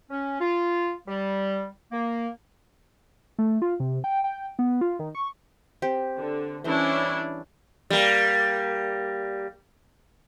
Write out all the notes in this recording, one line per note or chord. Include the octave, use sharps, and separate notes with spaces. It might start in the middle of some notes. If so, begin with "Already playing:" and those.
C#4
F4
G3
A#3
A3
F4
C3
G5
G5
B3
F4
D#3
C#6
C4 G4
D3
E3 G3 C#4 D4 E4 C5
G3 A#3